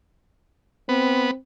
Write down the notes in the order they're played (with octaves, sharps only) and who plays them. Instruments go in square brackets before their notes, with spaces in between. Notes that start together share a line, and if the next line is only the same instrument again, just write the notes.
[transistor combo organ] B3 [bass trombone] C4